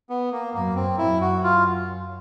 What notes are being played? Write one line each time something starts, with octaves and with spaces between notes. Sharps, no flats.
B3
A#3
F#2 A#3
C4
F#2 E4
F#4
F4